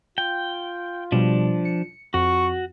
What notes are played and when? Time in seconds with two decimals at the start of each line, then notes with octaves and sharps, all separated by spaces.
0.18 F4 G5
1.12 B2 F3 G3 D4
1.65 C#7
2.14 F2 F#4 C#6